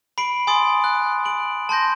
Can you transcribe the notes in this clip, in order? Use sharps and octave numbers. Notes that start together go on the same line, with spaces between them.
B5 C7 D7 F#7
G#5 C6 D#6 A6 D7
F#6
D7 F#7
A5 C6 G6 A#6